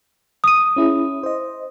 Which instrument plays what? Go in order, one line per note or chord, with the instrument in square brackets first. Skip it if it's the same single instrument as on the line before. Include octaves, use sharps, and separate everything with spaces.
[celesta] D#6 D#7
[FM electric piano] C#4 E4 G#4
C5 D#5